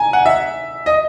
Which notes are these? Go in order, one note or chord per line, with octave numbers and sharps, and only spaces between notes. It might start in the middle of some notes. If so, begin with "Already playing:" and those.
Already playing: G#5 A#5
F#5
E5
D#5